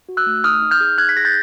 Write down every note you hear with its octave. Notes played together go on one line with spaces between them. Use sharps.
F#4
E6 F#6
A3
D#4 D#6 F6
D#4
F6 G6
G#4
D#4 F#6 G#6
B6
G#4 A#6
G6 A6